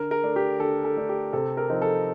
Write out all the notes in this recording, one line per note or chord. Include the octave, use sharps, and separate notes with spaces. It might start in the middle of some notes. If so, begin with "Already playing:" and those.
Already playing: D3 A#4
A#4
A3 D4
G4
D3 A4
A4
A3 D4
G4
C3 A4
A#4
F3 C4 D#4
A4